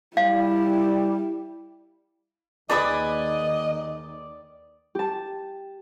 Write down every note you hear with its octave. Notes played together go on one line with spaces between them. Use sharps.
G3 E4 F5
D#2 D#3 A#3 G#4 B4 D5 D#5 D#6
G4 A5